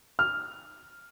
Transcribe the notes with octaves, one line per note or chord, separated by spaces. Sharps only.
F6